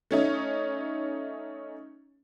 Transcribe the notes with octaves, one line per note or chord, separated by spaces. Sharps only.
A3 C#4 D#4